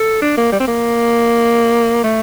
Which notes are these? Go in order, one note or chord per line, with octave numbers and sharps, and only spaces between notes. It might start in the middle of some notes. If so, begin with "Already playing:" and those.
Already playing: A4
D4
A#3
G3
C4
A#3
A3